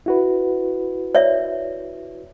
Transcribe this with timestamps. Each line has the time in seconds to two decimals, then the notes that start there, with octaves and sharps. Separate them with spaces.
0.06 E4 F#4 B4
1.15 C#5 D5 E5